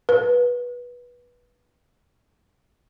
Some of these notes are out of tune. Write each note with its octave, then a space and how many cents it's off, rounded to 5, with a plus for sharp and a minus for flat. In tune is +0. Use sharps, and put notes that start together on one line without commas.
B4 -15